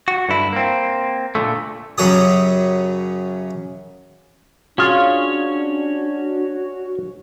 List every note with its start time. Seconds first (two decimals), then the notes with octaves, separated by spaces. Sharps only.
0.08 F#4
0.29 G2 D3 E4
0.53 A#3 C4
1.35 A#2 D3 A3
1.98 F#2 C#3 F#3 F#4 G4 D#6
4.78 C#4 D4 F4 F#4 G#4 C#5 F5